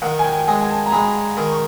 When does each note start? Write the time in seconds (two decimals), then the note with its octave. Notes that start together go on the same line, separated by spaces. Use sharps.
0.02 D#3 F#5
0.19 G#5
0.24 G5
0.39 G5
0.47 G#3 G#5
0.61 G#5
0.70 A5
0.86 A#5
0.92 G#3 B5
1.37 D#3
1.52 C#6